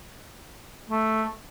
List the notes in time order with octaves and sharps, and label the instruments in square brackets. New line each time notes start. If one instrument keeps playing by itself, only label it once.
[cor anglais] A3